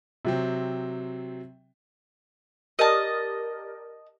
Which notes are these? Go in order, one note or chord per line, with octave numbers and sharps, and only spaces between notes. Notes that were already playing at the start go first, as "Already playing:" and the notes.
C3 F#3 C4
G4 A#4 D5 D#5 A5